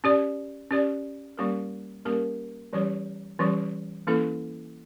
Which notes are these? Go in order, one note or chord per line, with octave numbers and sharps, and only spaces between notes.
C#4 G4 D5
C#4 G4 D5
G3 A#3 C#4 G4 A#4
G3 A#3 C#4 G4 A#4
E3 G3 C#4 G4 C#5
E3 G3 C#4 G4 C#5
E3 A#3 C#4 E4 A4